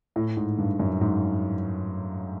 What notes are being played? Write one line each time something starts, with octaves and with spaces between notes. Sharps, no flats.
A2
G#2
G2
F#2
G#2